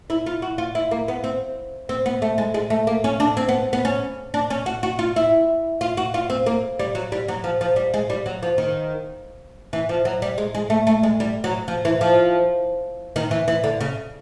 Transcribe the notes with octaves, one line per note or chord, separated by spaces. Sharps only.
E4
F4
F#4
F4
E4
A#3
B3
C4
C4
B3
A3
G#3
G#3
A3
A#3
C#4
D4
C4
B3
B3
C#4
D4
C#4
F#4
F#4
F4
E4
F4
F#4
F4
C4
A#3
G3
F#3
G3
F#3
F3
F3
G3
G#3
G3
F#3
F3
D#3
E3
F3
F#3
G3
G#3
G#3
A3
A3
G#3
G3
F#3
F3
E3
F3
D#3
E3
E3
D3
C#3